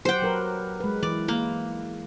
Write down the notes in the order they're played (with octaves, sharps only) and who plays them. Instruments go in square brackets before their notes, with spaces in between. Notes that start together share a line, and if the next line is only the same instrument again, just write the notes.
[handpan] F#3 G4 F#5 [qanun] C5 G5
[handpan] F#3 A#4 B4
G#3 B4
[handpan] E3 [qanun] D5
[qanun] A#3